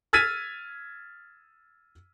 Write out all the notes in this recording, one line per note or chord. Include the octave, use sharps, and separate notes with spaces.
E6 F6 G#6 A6 B6 D#7